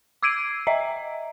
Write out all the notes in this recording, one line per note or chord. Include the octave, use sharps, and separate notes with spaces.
D6 E6 G#6 C7 D7 D#7
D#5 E5 A#5